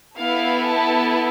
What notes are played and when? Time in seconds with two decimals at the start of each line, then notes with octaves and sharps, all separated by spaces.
0.17 B3 E4 A4 F5
0.67 A5